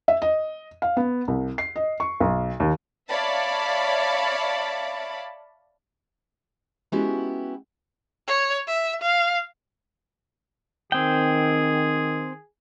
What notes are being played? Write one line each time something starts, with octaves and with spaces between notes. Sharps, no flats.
E5
D#5
F5
B3
C2
C7
D#5
C#6
B1
D#2
C#5 D5 E5 F5 A5 B5
G#3 B3 C#4 E4 F#4 G4
C#5
E5
F5
D#3 C4 G#4 G5